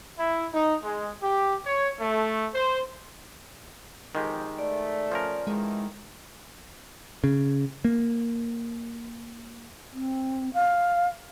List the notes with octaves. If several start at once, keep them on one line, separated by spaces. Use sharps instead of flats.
E4
D#4
G#3
G4
C#5
A3
C5
F2 D#3 G#3 G4
A3 D5
F3 C#4 A#4
D#3 E3 G#3 A3
C#3
A#3
C4
F5